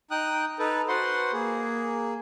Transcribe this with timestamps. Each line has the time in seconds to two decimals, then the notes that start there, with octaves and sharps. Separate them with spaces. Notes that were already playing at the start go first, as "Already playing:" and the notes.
0.11 D#4 G5 D#6 F#6
0.59 D#4 A4 B4
0.88 F#4 B4 C5 F#5 C6
1.33 A#3 G#4